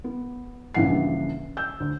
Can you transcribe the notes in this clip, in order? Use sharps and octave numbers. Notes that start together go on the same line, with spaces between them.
B3
A#1 G2 C#3 E3 F#5 C7
E6 G6
D2